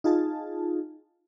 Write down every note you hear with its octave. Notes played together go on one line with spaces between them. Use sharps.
D#4 F4 G#4 A5